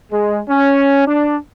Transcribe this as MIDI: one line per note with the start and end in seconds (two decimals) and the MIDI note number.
0.12 0.40 56
0.49 1.04 61
1.07 1.36 62